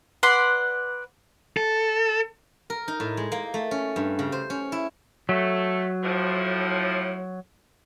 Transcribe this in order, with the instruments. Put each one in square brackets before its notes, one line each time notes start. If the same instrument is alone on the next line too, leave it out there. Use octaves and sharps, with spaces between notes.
[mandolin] B4 D5 F#5 C6
[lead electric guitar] A4
[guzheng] A#4
D#4
A2
G#3
A#3
A3
C#4
G2
C#3
C5
C#4
E4
[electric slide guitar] F#3 [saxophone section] A3
[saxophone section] A2 F3